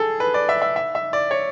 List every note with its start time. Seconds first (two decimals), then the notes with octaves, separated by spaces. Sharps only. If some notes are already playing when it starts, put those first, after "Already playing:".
Already playing: G#4 A4
0.20 B4
0.34 D5
0.49 E5
0.62 E5
0.76 E5
0.95 E5
1.13 D5
1.31 C#5